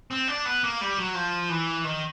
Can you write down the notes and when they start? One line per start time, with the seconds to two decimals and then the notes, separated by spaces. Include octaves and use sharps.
0.11 C4
0.28 D4
0.45 B3
0.64 A#3
0.81 G3
0.98 F#3
1.15 F3
1.49 E3
1.84 D#3